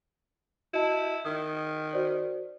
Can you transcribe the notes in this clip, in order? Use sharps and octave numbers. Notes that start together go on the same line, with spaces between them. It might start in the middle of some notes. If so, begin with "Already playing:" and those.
E4 F#4 D#5 A5
D#3 D#6
F#4 C5 D5